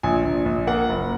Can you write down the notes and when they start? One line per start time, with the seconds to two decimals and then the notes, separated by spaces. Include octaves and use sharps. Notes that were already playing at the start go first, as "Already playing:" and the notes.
0.03 A#1 G#5
0.24 A#1
0.45 A#1
0.67 A#3 F#5
0.89 F#1